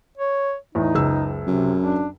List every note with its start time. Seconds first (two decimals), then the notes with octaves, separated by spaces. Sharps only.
0.18 C#5
0.75 E2 A2 D#4
0.95 F#1 C#2 E6
1.47 F#2 C3
1.81 D4